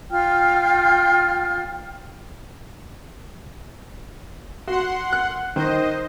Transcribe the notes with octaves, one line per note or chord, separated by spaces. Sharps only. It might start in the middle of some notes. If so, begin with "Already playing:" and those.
F4 G5 F6
F#4 F#5 C6
F#6
D#3 C5 D#5